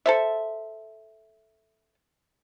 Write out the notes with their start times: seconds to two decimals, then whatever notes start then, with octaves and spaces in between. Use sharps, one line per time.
0.06 A4 C5 E5